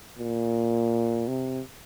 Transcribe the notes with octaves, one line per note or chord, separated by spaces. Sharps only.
A#2
C3